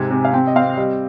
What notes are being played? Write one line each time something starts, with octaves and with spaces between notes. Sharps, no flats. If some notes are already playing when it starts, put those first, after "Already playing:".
Already playing: G#2 C3 C4 G#5
C3
F5
C4 G5
D#5
C4 F5
G3 D#5